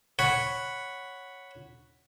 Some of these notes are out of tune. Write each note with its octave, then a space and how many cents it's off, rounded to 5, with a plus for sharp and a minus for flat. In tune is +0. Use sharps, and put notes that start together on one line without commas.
C#5 +0 F#5 +0 B5 +0